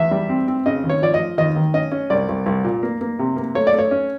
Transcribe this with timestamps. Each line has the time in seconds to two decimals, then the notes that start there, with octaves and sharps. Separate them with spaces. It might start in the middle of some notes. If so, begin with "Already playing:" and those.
Already playing: E2 E5
0.11 G3
0.29 C4
0.48 C4
0.66 C#3 D#5
0.84 D#2
0.90 C#5
1.02 F3 D5
1.14 D#5
1.19 F3
1.38 D#2 D#5
1.56 D#3
1.74 C#4 D#5
1.92 C#4
2.10 C2 D5
2.29 C2
2.46 C2
2.64 A#2
2.83 A#3
3.01 A#3
3.19 C3
3.36 A#3
3.55 A3 C#5
3.67 D5
3.73 A3
3.79 C#5
3.91 C#4